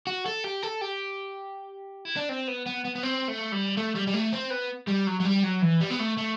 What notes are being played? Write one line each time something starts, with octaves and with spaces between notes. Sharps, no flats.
F#4
A4
G4
A4
G4
E4
D4
C4
B3
B3
B3
B3
C4
A3
G3
A3
G3
G3
A3
C4
B3
G3
F#3
F#3
G3
F#3
E3
G3
B3
A3
A3